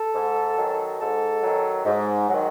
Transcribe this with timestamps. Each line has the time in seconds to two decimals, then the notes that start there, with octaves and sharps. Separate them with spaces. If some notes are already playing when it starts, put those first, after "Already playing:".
Already playing: A4
0.15 G#2
0.57 D#3 F#3
1.00 G#2 A4
1.43 D#3 F#3
1.86 G#2
2.28 D#3 F#3